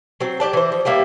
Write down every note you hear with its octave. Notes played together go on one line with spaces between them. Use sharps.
F#3 C4
G4 D5 A5
E3 C5
F3
G3 A#3 E4 G4